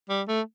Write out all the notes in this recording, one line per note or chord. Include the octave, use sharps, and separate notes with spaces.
G3
A3